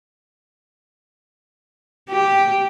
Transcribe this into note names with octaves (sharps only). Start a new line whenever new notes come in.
G4